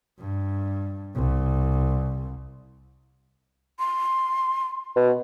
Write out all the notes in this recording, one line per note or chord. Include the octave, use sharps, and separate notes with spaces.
G2
C2
C6
B2